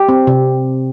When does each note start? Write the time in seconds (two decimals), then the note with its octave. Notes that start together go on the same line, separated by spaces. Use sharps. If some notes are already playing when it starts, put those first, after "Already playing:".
Already playing: G4
0.09 C4
0.27 C3